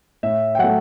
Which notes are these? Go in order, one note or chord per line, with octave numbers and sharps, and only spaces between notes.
A2 E5
G5
F#3 A3 F#5